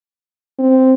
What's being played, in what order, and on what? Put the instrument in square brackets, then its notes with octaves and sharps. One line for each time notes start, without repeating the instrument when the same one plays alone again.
[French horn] C4